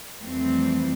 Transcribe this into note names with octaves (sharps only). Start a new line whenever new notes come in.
F2 E3 G3 A3 C4